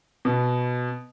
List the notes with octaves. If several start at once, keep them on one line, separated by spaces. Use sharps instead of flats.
B2